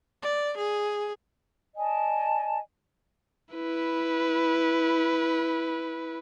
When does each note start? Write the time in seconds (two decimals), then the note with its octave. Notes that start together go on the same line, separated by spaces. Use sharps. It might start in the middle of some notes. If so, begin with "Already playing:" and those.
0.22 D5
0.57 G#4
1.77 D5 D#5 G#5 A5
3.55 E4 B4